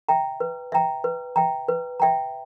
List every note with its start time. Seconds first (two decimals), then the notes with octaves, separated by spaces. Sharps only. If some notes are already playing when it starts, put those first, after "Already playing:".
0.09 E5 G5 A#5
0.40 B4
0.72 E5 G5 A#5
1.04 B4
1.36 E5 G5 A#5
1.68 B4
2.00 E5 G5 A#5